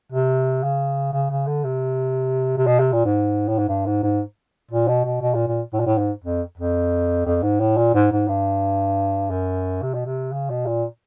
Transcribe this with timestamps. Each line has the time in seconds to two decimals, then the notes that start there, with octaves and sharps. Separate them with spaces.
0.12 C3
0.63 C#3
1.13 C#3
1.30 C#3
1.47 D3
1.64 C3
2.57 C3
2.66 B2
2.79 C3
2.92 A#2
3.05 G#2
3.48 A2
3.58 G#2
3.68 G2
3.86 G#2
4.03 G#2
4.71 A#2
4.88 B2
5.04 B2
5.21 B2
5.34 A#2
5.47 A#2
5.73 A2
5.80 A#2
5.86 A2
5.98 G#2
6.24 F2
6.57 F2
7.26 F2
7.42 G#2
7.60 A2
7.77 A#2
7.94 G#2
8.11 G#2
8.28 G2
9.30 F#2
9.82 C3
9.94 B2
10.06 C3
10.32 C#3
10.50 B2
10.66 A#2